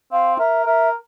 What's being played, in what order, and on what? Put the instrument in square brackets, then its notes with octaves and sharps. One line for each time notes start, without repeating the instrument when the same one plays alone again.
[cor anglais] C4 [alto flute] F5
[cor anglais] A#4 [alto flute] E5
[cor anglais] A#4 [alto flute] E5